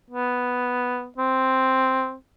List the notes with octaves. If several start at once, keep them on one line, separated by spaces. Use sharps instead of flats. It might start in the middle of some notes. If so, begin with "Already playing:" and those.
B3
C4